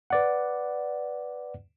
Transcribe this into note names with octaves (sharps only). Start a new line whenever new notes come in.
B4 D5 F#5